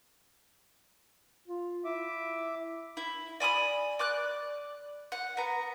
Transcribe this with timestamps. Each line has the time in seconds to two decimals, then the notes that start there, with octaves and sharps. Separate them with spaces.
1.48 F4
1.85 E4 E5 D6
2.97 E4
3.40 D5 G#5 B5 D#6
3.99 D5 D6 F#6
5.12 F#5
5.37 B3 A#5